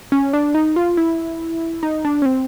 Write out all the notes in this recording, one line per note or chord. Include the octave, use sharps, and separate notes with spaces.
C#4
D4
D#4
F4
E4
D#4
D4
C#4
C4